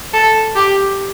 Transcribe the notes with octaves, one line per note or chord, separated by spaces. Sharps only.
A4
G4